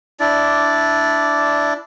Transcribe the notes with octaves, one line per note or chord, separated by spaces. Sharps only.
D4 E4 D5